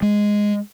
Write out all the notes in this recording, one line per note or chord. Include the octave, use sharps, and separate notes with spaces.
G#3